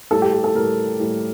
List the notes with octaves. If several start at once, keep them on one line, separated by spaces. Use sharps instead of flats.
A2 G3 A4
G4
G4
A4
A2 G3 A#4
A2 G3